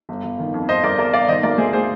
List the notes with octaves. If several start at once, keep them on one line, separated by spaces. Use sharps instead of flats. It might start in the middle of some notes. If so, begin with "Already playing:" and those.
G1
G1
D#3
F2
F2 C5 D#5
G1 A#4 D5
G1 A#4 D5
G1 D5 F5
D#3 C5 D#5
D2 A#4 D5
D2 G#4 C5
G#4 C5